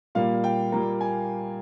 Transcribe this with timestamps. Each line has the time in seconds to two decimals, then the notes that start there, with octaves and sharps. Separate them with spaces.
0.15 A#2 G3 A#3 F5
0.44 G5
0.72 A#2 G3 A#3 A#5
1.01 G#5